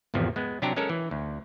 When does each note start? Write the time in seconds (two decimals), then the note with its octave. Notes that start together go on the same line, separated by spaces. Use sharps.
0.14 G#1 E2 C3 F3
0.36 G#3 B3
0.62 C3 F#3 D4 G4 A#5
0.76 G#3 C#4 A4 A#4
0.89 E3
1.11 D2